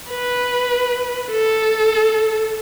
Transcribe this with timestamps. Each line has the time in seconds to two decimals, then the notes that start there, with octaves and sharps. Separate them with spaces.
0.11 B4
1.32 A4